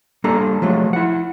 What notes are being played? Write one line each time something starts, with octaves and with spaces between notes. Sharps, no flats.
G3 A#3 D4 A4 A#5
F3 F#3 G#3 A3
E4 F#5